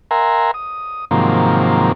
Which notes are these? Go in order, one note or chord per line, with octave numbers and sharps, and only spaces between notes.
A#4 E5 F#5 G#5 A#5 C6
D#6
G#2 C3 D#3 F3 F#3 A#3